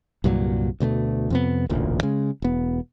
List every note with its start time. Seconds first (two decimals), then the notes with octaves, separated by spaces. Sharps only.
0.24 C2 G2 A#2 F#3
0.80 D2 B2 G3 A3
1.30 F2 C3 B3
1.69 E1 A1 D2 A#2
2.03 C#3 G#3
2.42 E1 B3